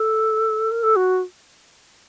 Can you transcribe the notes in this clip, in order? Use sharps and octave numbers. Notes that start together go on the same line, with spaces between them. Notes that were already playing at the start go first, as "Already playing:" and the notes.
Already playing: A4
A#4
A4
F#4